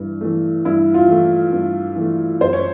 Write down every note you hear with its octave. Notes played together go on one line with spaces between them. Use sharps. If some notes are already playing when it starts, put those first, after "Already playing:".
Already playing: G2 E3
E3 A3
G2 E4
F4
E3 A3
G2
E3 A3
F#2 C5
C#5